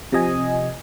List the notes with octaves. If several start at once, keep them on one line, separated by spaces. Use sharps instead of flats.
C3 F3 D#5 G#5